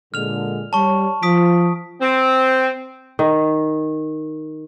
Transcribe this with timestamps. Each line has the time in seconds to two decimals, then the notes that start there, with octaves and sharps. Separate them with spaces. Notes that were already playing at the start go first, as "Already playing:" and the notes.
0.14 A#2 D3 G#3 F6 F7
0.73 G3 C#5 A5 C#6
1.23 F3 D#6 B6 D7
2.01 C4
3.19 D#3